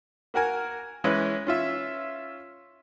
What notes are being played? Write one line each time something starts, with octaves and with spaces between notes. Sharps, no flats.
A#3 F#4 A#4 G#5
E3 G#3 C#4 E4 B4
C#4 F4 E5